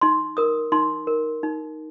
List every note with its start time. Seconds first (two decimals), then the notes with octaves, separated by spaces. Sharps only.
0.01 D#4 C6
0.37 A#4 D#6
0.72 D#4 C6
1.07 A#4
1.43 D#4